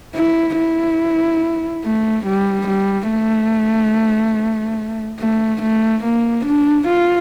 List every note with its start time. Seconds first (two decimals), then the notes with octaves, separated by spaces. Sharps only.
0.16 E4
0.58 E4
1.84 A3
2.26 G3
2.68 G3
3.10 A3
5.20 A3
5.62 A3
6.04 A#3
6.46 D4
6.88 F4